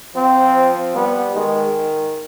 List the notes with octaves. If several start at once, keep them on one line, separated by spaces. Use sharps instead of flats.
F3 C4
G3 B3
D#3 G#3